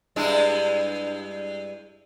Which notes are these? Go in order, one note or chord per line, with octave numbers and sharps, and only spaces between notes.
G2 G#3 E4